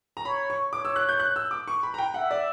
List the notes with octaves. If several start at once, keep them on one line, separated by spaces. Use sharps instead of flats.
A#5
C#5 B5
C#6
C#5 D6
E6
F#6
G6
F#6
E6
D6
C#6
B5
A#5
G5
E5 F#5
D5